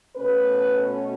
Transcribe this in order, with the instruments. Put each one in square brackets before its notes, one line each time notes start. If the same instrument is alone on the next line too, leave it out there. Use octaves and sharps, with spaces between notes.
[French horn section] B2 A3 C#4 B4